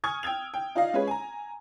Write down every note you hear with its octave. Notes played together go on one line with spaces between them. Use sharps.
G#5 C#6 D#6 F6 G#6
G5 E6 G#6 F7
G5
D#4 F4 D5 D#5 F5
G#3 C#4 F4 G#4 B4 C#5
G#5 A#5